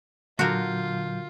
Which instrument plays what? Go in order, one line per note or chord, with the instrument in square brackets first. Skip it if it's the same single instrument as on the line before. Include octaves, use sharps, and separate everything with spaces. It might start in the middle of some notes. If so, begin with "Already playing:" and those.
[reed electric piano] A#2 F#3 G6 [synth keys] D3 [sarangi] F4 [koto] F#4 A#4